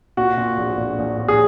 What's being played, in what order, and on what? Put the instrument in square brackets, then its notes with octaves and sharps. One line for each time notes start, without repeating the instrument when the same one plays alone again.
[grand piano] A#2 F#4
A#2
A#1
A#1
A#1
A#1
G#4